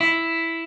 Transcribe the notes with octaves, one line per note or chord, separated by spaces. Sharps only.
E4